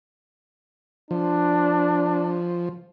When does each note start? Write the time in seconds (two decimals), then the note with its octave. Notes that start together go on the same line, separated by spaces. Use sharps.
1.11 F3 D4